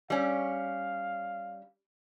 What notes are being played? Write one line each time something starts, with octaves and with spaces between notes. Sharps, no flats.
G3 C#4 F5